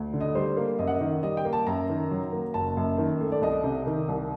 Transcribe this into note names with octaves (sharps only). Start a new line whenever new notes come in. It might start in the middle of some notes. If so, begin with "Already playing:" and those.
Already playing: D2
D3
D#5
G3 C5
A#3
F#2 D#5
F#5
D#5
D#3
G3 D#5
G5
A#3
A5
F#2 A#5
D#3
F#3
A#3
F#1 A5
F#2
D#3
A3
D5
C2 D#5
C3
D#3
C2